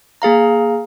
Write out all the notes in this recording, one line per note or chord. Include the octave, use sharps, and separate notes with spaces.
A#3 G#4 F5 A#5